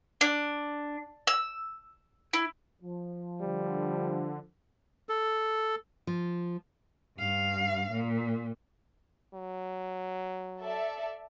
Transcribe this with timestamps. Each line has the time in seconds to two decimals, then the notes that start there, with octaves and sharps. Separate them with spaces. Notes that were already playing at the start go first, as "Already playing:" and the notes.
0.21 D4
1.27 E6
2.33 E4
2.82 F3
3.40 D3 G3
5.09 A4
6.07 F3
7.18 G2 F5
7.91 A#2
9.34 F#3
10.62 A4 D5 E5